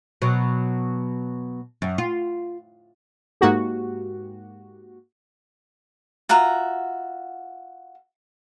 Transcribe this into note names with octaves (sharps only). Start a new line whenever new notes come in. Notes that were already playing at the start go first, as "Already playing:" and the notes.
B2 F#3
F#2
F4
G#2 A#3 F#4 G4
F4 F#4 E5 A#5